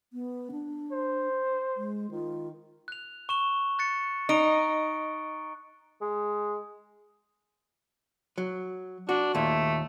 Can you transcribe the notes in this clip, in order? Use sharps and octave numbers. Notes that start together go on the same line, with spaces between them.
B3
D4
C5
G#3
D#3 F4
F#6 F7
C#6 E7 G7
F#6 A6 C#7
D#4 C#6 D7 G7
G#3
F#3
D4 F#4
D#2 A#2 A3